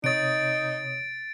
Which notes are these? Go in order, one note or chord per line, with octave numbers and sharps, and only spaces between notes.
C3 D#4 C#5 D#6 A6 D7